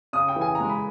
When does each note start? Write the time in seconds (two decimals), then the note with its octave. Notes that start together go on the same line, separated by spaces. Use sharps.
0.13 C#3 D#6
0.28 G5
0.36 E3
0.41 G#5
0.55 A#5
0.60 G#3
0.69 B5